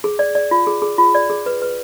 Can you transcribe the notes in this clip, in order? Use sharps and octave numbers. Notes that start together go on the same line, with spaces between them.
G#4
D5
D5
F4
G#4
G#4
F4
D5
G#4
B4
B4